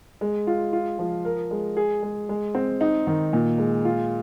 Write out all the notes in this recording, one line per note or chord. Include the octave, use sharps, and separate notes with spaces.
G#3
F4
F4
F3
A#4
G#3
G#4
G#3
G#3
C4
D#4
D#3
A#2
G#3
F4